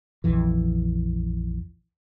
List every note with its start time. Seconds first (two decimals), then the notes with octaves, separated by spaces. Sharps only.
0.24 A#1 F2 E3